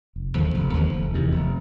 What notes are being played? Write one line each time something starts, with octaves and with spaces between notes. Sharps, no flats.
F1
D#2 D3 F3
F1
D#2 D3 F3
F1
E2 C3 D#3
F1